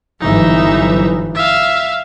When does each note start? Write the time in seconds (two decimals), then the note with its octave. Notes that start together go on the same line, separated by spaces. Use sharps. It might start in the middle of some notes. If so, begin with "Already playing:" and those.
0.21 G1 F#2 E3 D#4 E5
1.35 E5 F5